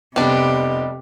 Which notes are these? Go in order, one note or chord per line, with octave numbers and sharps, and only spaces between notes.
F1 C3 G3 B3 D4 G4 D#5